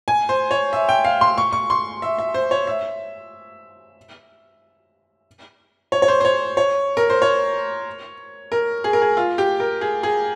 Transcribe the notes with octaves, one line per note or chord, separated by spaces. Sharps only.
G#5
C5
C#5
E5
G5
F5
C6
C#6
C#6
C6
E5
E5
C5
C#5
E5
C#5
C#5
C5
C5
C#5
C#5
A#4
C5
C#5
A#4
G#4
A#4
G#4
F4
G4
A#4
G#4
G#4